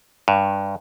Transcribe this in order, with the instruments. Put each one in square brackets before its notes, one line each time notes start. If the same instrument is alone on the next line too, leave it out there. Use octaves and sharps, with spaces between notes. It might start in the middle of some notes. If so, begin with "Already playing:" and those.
[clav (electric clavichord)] G2